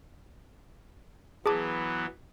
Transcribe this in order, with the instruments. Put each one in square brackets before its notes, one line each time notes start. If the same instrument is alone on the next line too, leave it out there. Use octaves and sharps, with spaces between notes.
[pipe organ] E3 F#3 B3 [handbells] G#4 A5 D6